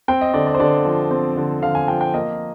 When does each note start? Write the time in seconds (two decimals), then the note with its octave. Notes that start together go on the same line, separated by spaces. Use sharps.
0.08 C4 G5
0.21 D#5
0.34 D3 D5
0.47 D5
0.55 C5
0.59 D3 D5
0.85 F3
1.11 C4
1.37 D3
1.62 D3 F5
1.75 G#5
1.88 F3 G5
2.01 G5
2.14 A#3 D#5